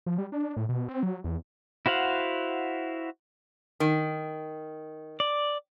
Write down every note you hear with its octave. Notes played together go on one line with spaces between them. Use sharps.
F3
G3
D4
A2
B2
C4
F#3
E2
E4 F#4 C5 F5 F#5
D#3
D5